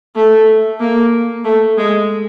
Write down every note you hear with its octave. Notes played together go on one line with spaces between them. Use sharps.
A3
A#3
A3
G#3